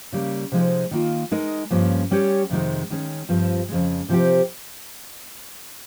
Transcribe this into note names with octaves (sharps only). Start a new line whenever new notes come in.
C#3 G3 A#3
C3 F3 G#3 D#4
D#3 A#3 F4
G#3 D#4 A#4 D#5
G2 F3 A#3 C#4
G3 C#4 G4 C#5
F2 C3 D#3 G#3
D#3 G#3 C#4
G2 F3 C4 F4
F2 C#3 G#3
C3 F3 C4 G4